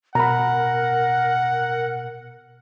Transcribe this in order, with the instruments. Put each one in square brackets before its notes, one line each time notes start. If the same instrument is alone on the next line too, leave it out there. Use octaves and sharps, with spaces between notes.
[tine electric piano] B2 [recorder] A#4 [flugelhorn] F#5 [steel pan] A#5 B5